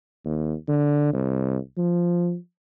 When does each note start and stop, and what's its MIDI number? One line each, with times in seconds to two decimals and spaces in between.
0.25 0.53 39
0.68 1.12 50
1.13 1.57 36
1.77 2.36 53